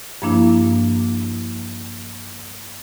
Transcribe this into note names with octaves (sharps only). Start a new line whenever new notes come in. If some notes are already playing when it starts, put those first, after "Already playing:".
G2 F3 A#3 D4 E4